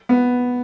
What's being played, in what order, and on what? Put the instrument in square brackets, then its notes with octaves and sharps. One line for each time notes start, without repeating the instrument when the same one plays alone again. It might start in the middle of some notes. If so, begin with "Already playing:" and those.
[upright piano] B3